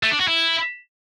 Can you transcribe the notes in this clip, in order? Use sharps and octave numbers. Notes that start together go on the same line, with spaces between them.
A3
D4
F#4
E4